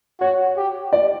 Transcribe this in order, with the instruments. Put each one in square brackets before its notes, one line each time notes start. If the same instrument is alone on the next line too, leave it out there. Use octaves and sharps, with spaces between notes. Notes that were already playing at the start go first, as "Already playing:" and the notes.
[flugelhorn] F#4 [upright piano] C#5
[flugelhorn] G4
[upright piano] D5